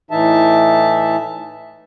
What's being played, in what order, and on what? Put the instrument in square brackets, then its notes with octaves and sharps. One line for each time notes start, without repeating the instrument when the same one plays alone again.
[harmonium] A2 E3 D#4 E5 A5